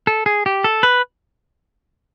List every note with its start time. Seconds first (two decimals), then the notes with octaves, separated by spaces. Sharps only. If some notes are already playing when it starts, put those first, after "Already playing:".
0.07 A4
0.26 G#4
0.46 G4
0.64 A4
0.83 B4